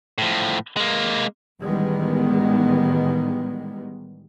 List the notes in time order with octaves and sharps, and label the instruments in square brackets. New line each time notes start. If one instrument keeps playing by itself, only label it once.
[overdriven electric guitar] A2 F3
G#3 A#3
[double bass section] A1 D#3 G3 G#3 B3